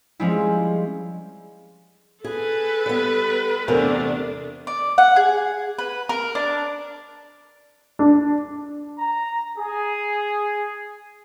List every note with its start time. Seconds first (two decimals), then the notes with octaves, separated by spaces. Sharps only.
0.20 F3 G3 G#3 C4 C#4 E4
2.24 G#4 A4 B4
2.86 G3 B3
3.68 E2 C3 A3 D4 A#4
4.67 D5
4.98 F#5
5.16 G#4
5.79 B4
6.09 A#4
6.35 D4
7.99 D4
8.99 A#5
9.58 G#4